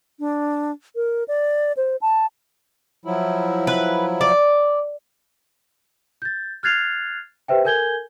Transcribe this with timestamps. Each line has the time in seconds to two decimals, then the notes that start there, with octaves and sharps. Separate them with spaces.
0.20 D4
0.96 A#4
1.28 D5
1.77 C5
2.02 A5
3.05 F3 F#3 E4
3.67 B4
4.21 D5
6.22 G6 A6
6.63 F6 F#6 G#6 A6 C7 F7
7.48 G4 B4 C5 E5 G5
7.64 A4 A#4 G#5 G6 G#6 G7